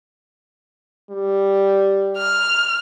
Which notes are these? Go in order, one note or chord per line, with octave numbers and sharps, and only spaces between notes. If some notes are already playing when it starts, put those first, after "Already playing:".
G3
F6